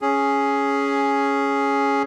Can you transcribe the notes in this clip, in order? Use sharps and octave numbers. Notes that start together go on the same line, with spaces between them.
C#4 G#4